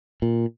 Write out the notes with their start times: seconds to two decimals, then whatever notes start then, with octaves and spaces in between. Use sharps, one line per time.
0.22 A#2